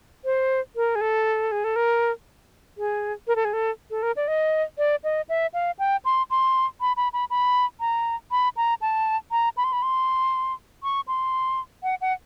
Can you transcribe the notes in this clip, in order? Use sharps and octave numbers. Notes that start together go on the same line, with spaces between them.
C5
A#4
G#4
A4
G#4
A4
A#4
G#4
A#4
A4
G#4
A4
A4
A#4
D5
D#5
D5
D#5
E5
F5
G5
C6
C6
B5
B5
B5
B5
A#5
B5
A#5
A5
A#5
B5
C6
B5
C6
C#6
C6
F#5
F#5